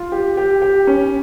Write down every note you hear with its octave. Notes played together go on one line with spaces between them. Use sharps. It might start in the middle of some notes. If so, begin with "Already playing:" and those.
Already playing: F4
G4
G4
G4
C#4